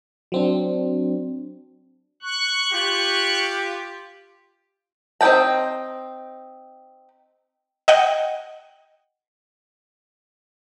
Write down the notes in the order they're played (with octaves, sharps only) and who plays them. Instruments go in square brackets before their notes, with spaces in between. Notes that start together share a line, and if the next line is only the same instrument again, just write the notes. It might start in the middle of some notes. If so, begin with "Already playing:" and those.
[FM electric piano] F#3 C4 D4
[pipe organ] C#6 F#6
[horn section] F4 G4
[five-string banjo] C4 D#4 D5 G5 A5
[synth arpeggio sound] D#5 F#5 G5